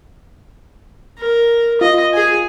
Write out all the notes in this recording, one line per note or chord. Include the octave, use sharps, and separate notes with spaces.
A#4
F4 D#5
G#4 G#5